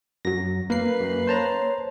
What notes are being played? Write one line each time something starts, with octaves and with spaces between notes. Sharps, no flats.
F#2 F#3 A#6
A#3 B4 C7
F#2
C5 C#5 A5 A#5